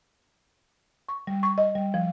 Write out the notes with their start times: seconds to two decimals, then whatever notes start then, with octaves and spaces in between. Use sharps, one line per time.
1.09 C#6
1.27 G3
1.43 C#6
1.58 D#5
1.75 G3
1.94 F3